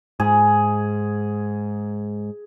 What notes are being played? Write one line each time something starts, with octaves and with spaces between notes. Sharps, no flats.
G#2 G#4